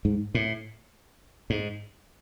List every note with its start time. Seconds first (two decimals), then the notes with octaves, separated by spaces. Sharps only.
0.05 G#2
0.35 A2
1.50 G#2